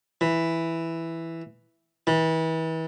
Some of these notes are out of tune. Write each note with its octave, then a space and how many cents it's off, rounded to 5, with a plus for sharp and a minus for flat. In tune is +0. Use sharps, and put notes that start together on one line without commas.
E3 +0
E3 -35